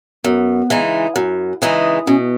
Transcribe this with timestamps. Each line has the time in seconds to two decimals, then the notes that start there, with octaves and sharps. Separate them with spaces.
0.24 F#2 B3
0.70 C#3 E3 G#3 D#4
1.16 F#2
1.62 C#3 E3 G#3 D#4
2.06 B2 C#4